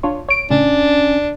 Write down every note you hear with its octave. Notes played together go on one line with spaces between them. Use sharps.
D4 F4 C#5
C#5 D7
A2 C#3 C#4 D4